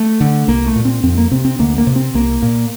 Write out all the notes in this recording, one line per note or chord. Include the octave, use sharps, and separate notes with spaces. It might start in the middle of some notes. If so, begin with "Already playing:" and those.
Already playing: A3
D3
C2 A#3
A3
A#2
C4
F2 C4
A#3
C3 C4
C4
D2 A#3
A#3
C3
C4
C2 A#3
A#2